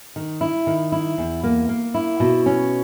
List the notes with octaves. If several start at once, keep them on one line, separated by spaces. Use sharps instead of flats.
D#3
E4
D#3
E4
E2
A#3
A#3
E4
B2
C#4